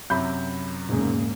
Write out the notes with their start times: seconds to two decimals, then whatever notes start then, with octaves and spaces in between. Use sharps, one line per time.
0.10 F#2 C3 E5 B5 G6
0.89 E1 G#2 C#3 A#3 G#4